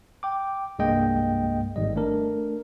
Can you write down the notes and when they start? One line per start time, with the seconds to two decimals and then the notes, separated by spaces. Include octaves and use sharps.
0.23 G5 D6
0.79 C2 G2 G#3 A#3 D#5 G5
1.76 G#1 G#2 G3 D#5
1.96 A3 D4 A#4